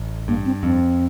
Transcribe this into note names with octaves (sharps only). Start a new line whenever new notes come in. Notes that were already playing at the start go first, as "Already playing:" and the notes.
Already playing: A1
G2 A#3
C4
F2 C4